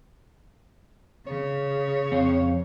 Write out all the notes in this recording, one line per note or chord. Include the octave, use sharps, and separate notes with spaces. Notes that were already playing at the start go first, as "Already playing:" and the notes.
C#3 C#5
F2 C4 F5